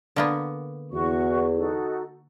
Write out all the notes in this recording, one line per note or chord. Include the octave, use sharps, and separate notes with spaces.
D3 A#3 B3
E2 F#4 C#6
D#4 F#4 A4